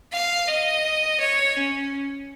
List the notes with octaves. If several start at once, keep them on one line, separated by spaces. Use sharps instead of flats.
F5
D#5
C#5
C#4